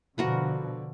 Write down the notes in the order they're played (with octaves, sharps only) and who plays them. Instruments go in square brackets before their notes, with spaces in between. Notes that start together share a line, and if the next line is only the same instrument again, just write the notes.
[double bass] B2 F3 [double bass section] D3 [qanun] F#4 A#4 B4